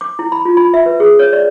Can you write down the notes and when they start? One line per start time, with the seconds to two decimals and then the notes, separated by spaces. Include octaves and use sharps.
0.01 D6
0.19 E4
0.32 B5
0.45 F4
0.57 B5
0.74 E5
0.86 B4
1.00 G#4
1.19 C#5
1.33 D5